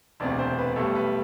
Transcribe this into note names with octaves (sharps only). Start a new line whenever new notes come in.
E1 D2 C3 D5
C5
B4
B1 A2 G3 A4
B4